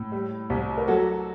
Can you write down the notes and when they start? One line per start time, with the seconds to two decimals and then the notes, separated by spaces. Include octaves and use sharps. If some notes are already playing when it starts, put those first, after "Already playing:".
Already playing: A2
0.12 G3
0.50 C2
0.78 A#4
0.87 F#3 F#4 A4